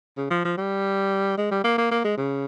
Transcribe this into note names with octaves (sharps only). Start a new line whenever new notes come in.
C#3
F3
F3
G3
G#3
G3
A#3
A#3
A#3
G#3
C#3